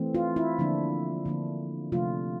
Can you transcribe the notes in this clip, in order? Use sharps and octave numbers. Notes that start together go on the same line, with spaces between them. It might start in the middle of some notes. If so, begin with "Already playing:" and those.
Already playing: E3 A3 C4
F4
E4
D3 F3 A#3 D4
D3 F3 A#3 D4
C3 F3 A3 D4 F4